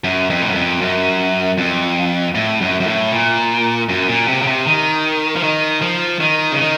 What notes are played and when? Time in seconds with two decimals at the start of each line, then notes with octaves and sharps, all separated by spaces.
0.04 F#2
0.30 F2
0.41 A2
0.48 F#2
0.55 F2
0.81 F#2
1.58 F2
2.35 A2
2.61 F#2
2.80 F#2
2.87 A2
3.12 A#2
3.89 F#2
4.09 A#2
4.28 C3
4.42 C#3
4.47 C3
4.66 D#3
5.36 F3
5.43 D#3
5.82 F3
6.20 D#3
6.52 C#3
6.59 D#3